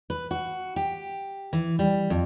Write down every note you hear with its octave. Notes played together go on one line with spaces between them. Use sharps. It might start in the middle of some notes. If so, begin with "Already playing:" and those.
B4
F#4
G4
E3
G3
F2